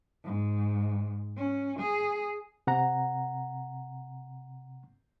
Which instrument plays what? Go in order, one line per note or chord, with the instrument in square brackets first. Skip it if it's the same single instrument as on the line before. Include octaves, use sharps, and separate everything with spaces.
[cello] G#2
C#4
G#4
[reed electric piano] C3 F#5 A#5